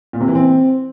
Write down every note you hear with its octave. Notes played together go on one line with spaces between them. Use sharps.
A#2
C3
E3
C4